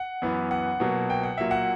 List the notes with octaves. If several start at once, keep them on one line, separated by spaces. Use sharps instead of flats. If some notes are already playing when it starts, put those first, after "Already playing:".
Already playing: F#5
F#2 E3 B3
F#5
B2 F#3 A#3
G5
F#5
A#2 F#3 A#3 E5
F#5